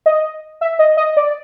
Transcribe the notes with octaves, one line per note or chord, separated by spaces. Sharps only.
D#5
E5
D#5
D#5
D5